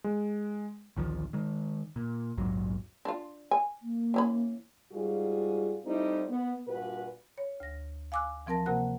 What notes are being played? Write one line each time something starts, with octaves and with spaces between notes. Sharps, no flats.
G#3
A1 D2 D#3 F3
D#3 G#3
A#2
A#1 E2 G#2 F#3
D4 F4
G#5
A#3
E3 C#4 B5
G#2 G3 F4 F#4 G#4
G3 A3 C4 D#4 E4
B3
G2 A#2 F#4 B4
C#5
D2 A#6
F5 G#5 D6 E6 F#6
E3 F3 C4 A#4 A5 A#6
C3 A#3 F#4 A#4 F#5 F#6